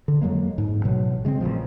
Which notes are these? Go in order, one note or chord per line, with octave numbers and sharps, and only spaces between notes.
D3
F2 F#3 G#3 A#3
G#2
A1 B2 F#3
C#3 G#3 B3 C4
A1 A#2 C#3 F3